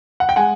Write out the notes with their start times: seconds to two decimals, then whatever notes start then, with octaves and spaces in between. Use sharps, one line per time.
0.20 F#5
0.29 G5
0.36 G#3 F#5 G#5